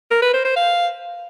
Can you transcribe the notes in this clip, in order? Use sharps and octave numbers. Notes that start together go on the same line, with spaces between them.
A#4
B4
C5
C5
F5